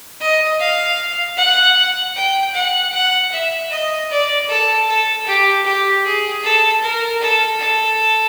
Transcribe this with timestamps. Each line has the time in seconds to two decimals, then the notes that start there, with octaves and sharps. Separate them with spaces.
0.21 D#5
0.60 F5
1.37 F#5
2.16 G5
2.54 F#5
2.93 F#5
3.32 E5
3.71 D#5
4.10 D5
4.48 A4
4.88 A4
5.27 G4
5.65 G4
6.05 G#4
6.43 A4
6.82 A#4
7.21 A4
7.60 A4